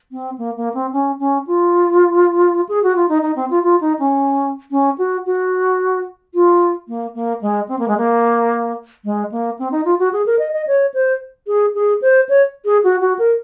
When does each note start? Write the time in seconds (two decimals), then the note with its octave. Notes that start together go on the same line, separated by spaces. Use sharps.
0.12 C4
0.38 A#3
0.57 A#3
0.74 C4
0.93 C#4
1.19 C#4
1.47 F4
2.69 G#4
2.83 F#4
2.96 F4
3.09 D#4
3.22 D#4
3.36 C4
3.50 F4
3.63 F4
3.81 D#4
3.99 C#4
4.71 C#4
4.98 F#4
5.26 F#4
6.34 F4
6.88 A#3
7.15 A#3
7.41 G#3
7.69 C4
7.79 A#3
7.88 G#3
7.98 A#3
9.05 G#3
9.32 A#3
9.59 C4
9.72 D#4
9.85 F4
9.99 F#4
10.13 G#4
10.26 A#4
10.39 D#5
10.53 D#5
10.67 C#5
10.94 C5
11.47 G#4
11.75 G#4
12.02 C5
12.29 C#5
12.65 G#4
12.84 F#4
13.01 F#4
13.19 A#4